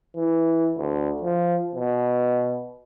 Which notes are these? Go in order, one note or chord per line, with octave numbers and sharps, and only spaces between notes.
E3
D2
F3
B2